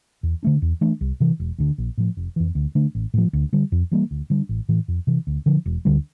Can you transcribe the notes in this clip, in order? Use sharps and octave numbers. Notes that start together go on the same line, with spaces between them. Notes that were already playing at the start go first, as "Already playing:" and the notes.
E2
D3 A3 D4
E2
E3 A3 D4
C2
C3 E3
E1
D2 D3
A#1
A2 F3
F1
F2 E3
D2
D3 A3 D4
A1
A2 F3
D2
D3 G3
F2
E3 G3 A#3
D2
D3 G3 D4
A1
A2 E3
F2
C3 E3
D2
D3 F3
E1
D2 D3 G3